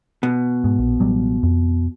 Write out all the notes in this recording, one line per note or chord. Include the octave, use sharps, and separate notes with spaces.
B2
G#2
A#1
A1 F#3 G3
F2